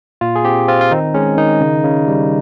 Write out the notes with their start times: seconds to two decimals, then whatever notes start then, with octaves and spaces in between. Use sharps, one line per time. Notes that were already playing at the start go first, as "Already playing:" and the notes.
0.21 A#2 F4
0.36 G#4
0.44 C4 G4
0.68 C4 F4
0.81 F4
0.92 D#3 D#4
1.14 G#3 C#4
1.37 D#3 D#4
1.61 C#3
1.84 C#3
2.08 G3